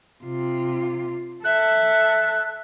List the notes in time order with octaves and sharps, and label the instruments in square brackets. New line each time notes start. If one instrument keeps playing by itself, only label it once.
[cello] C3 F4
[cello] A4 [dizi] E5 [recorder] F#6